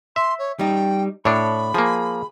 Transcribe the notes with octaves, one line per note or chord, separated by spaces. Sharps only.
E5 C6
C#5
G3 D#4 G5
A2 D4 C#5 B5
F3 A#3 G#4